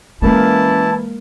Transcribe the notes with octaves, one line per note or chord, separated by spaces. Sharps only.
E3 G#3 A#3 C#4 E4 A#4 A5